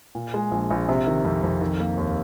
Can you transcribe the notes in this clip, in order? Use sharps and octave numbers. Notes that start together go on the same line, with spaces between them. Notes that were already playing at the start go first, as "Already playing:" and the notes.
A#2
G#3
A#1
A#1
C3
D#3
F2
F2
D#3
A#3
D#2